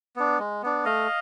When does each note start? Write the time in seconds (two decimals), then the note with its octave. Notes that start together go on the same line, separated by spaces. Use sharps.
0.16 B3 D4
0.39 G#3
0.63 B3 D4
0.85 A3 D#5 F5